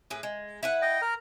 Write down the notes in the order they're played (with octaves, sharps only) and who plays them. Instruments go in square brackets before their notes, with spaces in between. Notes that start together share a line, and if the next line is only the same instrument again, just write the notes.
[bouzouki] A2 G#4 B4
G#3
E4 B4 F#5
[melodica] D#5 G5
A#4 A#5